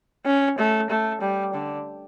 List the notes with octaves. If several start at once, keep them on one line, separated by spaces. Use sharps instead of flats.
C#4
A3
A3
G3
D3